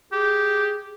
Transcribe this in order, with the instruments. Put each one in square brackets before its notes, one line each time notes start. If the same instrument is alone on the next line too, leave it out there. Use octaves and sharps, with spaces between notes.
[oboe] G4 [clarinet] G#4